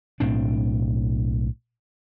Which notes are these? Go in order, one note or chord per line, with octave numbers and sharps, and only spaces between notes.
B1 A2 C4 D4